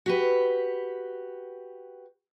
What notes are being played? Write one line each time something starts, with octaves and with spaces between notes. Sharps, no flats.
F#4 G4 B4